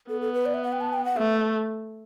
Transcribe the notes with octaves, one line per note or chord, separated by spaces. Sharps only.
B3 A4
A4
B4
D5
E5
F#5
G5
A5
G5
F#5
A3 E5